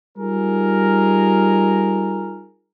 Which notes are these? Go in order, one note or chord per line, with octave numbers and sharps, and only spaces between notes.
G3 D#4 F4 G#4 A#4